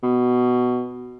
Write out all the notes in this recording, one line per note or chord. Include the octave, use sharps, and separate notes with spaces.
B2